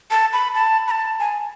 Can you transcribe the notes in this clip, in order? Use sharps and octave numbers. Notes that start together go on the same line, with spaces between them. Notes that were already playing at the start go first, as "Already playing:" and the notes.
A5
B5
A5
B5
A5
G#5